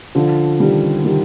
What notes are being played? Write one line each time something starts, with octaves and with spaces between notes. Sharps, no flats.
D3 F3
D#3 G3
D#3 G3